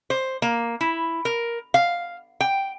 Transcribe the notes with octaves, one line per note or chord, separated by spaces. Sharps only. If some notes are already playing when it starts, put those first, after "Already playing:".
C5
A#3
E4
A#4
F5
G5